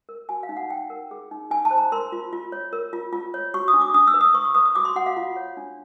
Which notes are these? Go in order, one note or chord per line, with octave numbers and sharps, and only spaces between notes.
A#4
F#4 G#5
F5
D#4
F#5
D#4 G5
A#4
G#4
D#4
D#4 G#5
A5
C5
A#5
A#4 C6
F4
F4
C#5
A#4
F4
F4
C#5
F#4 C#6
D#6
D4
D6
D4 D#6
E6
B4
D#6
B4 C#6
C#6
B4 D#6
D#6
F#4 D6
C6
F#4 F#5
F5
F4
C#5
D4